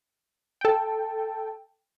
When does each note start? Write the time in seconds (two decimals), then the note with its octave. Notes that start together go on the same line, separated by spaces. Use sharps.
0.61 A4 G5